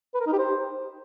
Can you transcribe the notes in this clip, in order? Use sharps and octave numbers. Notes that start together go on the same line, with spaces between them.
B4
A#4
D#4
G4
C5